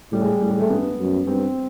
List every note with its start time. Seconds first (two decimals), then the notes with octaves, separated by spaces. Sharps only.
0.12 A2 G3
0.22 G#3
0.41 A2 G3
0.51 G#3
0.60 A3
0.70 G2 B3
0.99 F#2
1.27 G2 C4